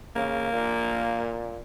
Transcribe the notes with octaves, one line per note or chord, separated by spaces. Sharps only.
C#3 A#3
A#2